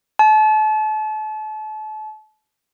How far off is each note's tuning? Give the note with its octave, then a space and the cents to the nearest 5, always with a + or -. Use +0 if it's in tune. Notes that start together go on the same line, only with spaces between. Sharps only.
A5 -35